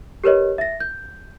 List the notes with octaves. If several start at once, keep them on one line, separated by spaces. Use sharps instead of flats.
G4 A#4 B4 C#5 D#5
E5 A#6
G6